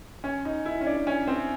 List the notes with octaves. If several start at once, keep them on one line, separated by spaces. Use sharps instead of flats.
C#4
D#4
E4
C#4
D4
C#4
C4